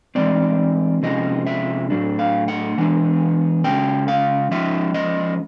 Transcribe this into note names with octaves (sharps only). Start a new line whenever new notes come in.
E3 G#3 C4 D5
C3 F3 G#3 C#4 D#5
E5
A2 F#3 A3 D4
F5
F#5
E3 G#3 B3 D4
C#3 E3 G#3 C#4 G5
F5
F3 G#3 C#4 E5
D#5